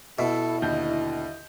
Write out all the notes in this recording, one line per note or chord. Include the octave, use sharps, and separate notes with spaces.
B2 E4 A4 E5
D#2 D3 D#5 G6